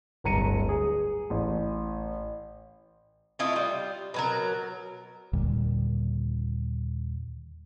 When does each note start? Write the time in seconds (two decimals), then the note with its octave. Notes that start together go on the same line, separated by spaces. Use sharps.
0.24 D1 G1 A#5 C#7 D#7
0.69 G#4
1.30 A1
3.39 A3 E4 F4 D#5
3.53 G3 F4
4.14 B2 F#3 A#4
5.33 D#2 A#2 D3 G3